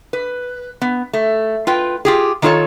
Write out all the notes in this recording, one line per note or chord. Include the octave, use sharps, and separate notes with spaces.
B4
B3
A3
F4 B4 G5
F4 G4 G#4
D#3 D4 F4 A4 C#5 A5